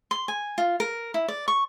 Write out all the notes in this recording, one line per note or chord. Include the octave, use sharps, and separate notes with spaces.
C6
G#5
F4
A#4
E4
D5
C#6